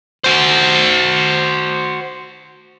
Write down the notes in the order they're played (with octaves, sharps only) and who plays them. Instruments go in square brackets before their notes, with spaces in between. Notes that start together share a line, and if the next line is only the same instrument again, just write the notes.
[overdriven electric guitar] F#4 C5